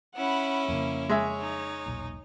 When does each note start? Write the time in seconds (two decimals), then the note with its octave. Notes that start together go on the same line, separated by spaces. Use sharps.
0.16 C#4 E4 F#5 B5
0.68 F2 C#3 A#3
1.09 G#3 C#5 E5
1.40 D#4
1.86 E1 B1 A#2